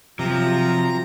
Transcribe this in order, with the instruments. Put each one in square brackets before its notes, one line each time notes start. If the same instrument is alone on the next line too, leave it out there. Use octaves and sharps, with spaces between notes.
[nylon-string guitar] C3 [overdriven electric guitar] F3 [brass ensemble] F#3 F4 [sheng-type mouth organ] A#5